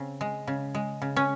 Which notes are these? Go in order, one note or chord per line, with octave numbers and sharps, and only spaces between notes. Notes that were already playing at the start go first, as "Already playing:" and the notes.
Already playing: C#3 C4
G#3
C#3
G#3
C#3
C#4